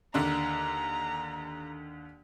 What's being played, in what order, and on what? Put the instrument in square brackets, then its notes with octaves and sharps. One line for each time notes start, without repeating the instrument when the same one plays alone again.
[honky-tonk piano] D#2 D3 D4 [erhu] A#5